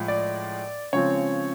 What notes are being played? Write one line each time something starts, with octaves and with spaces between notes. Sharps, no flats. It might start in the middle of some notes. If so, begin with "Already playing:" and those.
Already playing: A2 F3 G#3
D5
C#3 F3 G#3 C4 C#5